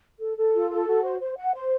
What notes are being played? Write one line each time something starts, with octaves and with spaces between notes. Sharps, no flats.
A4
A4
F4
A4
F#4
C5
C5
F#5
C5